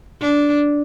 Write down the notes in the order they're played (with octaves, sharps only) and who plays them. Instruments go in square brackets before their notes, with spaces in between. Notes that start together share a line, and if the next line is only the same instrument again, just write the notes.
[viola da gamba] D4